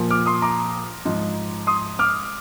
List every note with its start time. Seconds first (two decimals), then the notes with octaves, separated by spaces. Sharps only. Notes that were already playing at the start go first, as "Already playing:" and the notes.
Already playing: A#2 F3
0.10 D6 F6
0.26 C6 D#6
0.42 A#5 D6
1.05 G#2 F3
1.67 C6 D#6
1.99 D6 F6